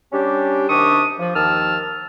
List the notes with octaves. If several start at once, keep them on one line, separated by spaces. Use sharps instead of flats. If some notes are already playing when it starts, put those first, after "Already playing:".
G3 C#4 D4 G4
C3 D#3 D4 G4 C#6 D#6
F3
D#2 D#3 F3 A5 E6 F6